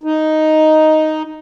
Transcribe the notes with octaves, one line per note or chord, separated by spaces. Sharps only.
D#4